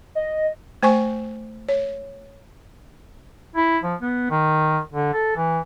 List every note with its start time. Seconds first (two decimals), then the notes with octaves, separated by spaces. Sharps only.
0.15 D#5
0.83 A3 C5 G#5 C#6
1.69 C#5
3.56 E4
3.84 F3
4.02 B3
4.30 D#3
4.92 D3
5.14 A4
5.36 E3